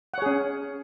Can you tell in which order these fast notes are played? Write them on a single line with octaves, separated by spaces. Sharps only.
F#5 C#5 G#4 C#4